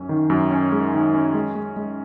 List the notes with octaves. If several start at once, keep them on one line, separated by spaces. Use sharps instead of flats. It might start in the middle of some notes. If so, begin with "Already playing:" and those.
Already playing: F#2 C#4
D#3
F#2
C#4
G#3
D#3
C#4
G#3
G#3
G#3